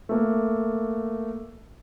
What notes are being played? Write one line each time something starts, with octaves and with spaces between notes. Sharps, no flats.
A3 A#3